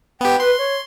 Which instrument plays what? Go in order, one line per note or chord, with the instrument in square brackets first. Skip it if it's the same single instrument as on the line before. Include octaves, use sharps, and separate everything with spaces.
[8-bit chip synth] B3 G4 [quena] G5
[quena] B4 [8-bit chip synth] C6
[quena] C#5